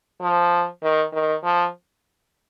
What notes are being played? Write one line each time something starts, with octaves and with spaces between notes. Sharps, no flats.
F3
D#3
D#3
F3